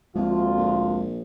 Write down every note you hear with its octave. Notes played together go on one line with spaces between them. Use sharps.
D2 F3 G#3 A#3 C4 F4
A#1